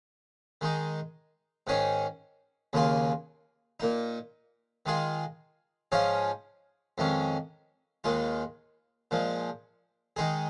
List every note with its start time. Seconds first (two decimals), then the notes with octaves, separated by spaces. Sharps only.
0.61 D#3 G#3 D#4
1.67 G#2 D#3 C#4 G#4
2.73 D#2 C#3 A#3 F4 G#4
3.80 A#2 A#3 D#4
4.86 D#3 G#3 F4 G#4
5.92 G#2 F3 C#4 F4 G#4
6.98 F2 D#3 G#3 C#4
8.04 D#2 D#3 G#3 F4
9.11 A#2 F3 G#3
10.16 D#3 G#3 D#4 G#4